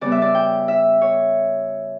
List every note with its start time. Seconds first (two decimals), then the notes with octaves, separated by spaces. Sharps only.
0.01 C#3 G3 B3 D5
0.12 E5
0.22 D5
0.35 G5
0.68 E5
1.02 C#5